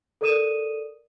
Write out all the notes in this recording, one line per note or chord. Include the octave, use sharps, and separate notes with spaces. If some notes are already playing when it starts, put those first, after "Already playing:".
A4 A#4 D5 D#6 D#7 E7